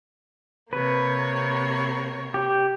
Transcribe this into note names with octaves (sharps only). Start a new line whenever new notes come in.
C3 A#3 B4 C#5
G4